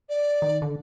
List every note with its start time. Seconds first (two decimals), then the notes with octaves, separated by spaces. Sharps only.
0.09 D5
0.42 D#3
0.62 D3